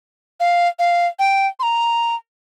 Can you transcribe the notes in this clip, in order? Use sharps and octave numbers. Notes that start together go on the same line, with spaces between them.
F5
F5
G5
C6
A#5